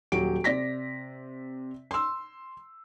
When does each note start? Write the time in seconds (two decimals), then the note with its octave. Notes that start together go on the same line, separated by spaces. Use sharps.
0.12 D#1 F#3 G4 D7
0.44 C3 D5 A#6 B6
1.91 C6 E6